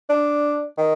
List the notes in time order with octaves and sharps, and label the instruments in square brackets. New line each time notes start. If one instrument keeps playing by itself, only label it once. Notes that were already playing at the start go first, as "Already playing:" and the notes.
[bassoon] D4
D#3